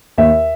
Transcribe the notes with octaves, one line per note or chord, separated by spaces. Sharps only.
D#2 E5